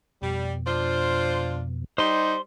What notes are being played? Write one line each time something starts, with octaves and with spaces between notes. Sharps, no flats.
F2 B2 G3
D4 F4 C5
G3 D#4 C5 C6